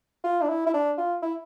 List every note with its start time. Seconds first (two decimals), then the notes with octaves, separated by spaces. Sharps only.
0.24 F4
0.42 D4
0.49 E4
0.66 E4
0.74 D4
0.98 F4
1.23 E4